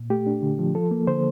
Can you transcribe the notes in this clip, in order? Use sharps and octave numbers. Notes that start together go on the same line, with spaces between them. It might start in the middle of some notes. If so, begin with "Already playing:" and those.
Already playing: A#2
A3 G4
D4
D3
F3
F3 A4
A#3
D3 C5